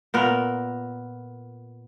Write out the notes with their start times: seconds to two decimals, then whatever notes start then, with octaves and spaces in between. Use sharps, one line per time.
0.14 A#2 B3 A#4